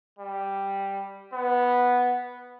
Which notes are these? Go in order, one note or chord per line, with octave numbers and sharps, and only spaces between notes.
G3
B3